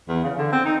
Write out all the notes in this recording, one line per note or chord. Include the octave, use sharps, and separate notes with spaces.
E2
C#3
D3
C4
D#4